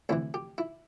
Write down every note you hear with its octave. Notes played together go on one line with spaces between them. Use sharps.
D2 C3 E3 E4
G4
E4